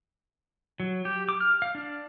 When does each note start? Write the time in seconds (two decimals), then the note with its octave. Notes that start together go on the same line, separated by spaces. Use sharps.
0.80 F#3
1.05 G4
1.29 D6
1.40 F6
1.62 F5
1.75 D4